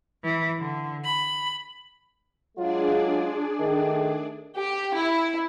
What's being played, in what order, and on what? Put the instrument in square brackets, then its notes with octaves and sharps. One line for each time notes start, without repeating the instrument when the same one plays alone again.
[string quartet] E3
D3
B5
[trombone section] F#3 G#3 F4 [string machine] D4 G#4 D5
[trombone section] D#3 A3
[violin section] G4
E4